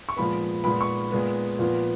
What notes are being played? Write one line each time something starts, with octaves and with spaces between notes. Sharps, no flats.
C#6
A#2 F3 G#3 B3 B5
A#2 G#3 B3 B5
C#6
A#2 G#3 B3
A#2 F3 B3